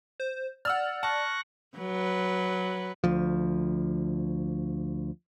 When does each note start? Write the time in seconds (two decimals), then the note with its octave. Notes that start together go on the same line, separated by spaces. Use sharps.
0.20 C5
0.65 D5 F#5 E6 F6
1.03 A5 C#6 F#6 A#6
1.77 F#3 B4
3.04 D2 F3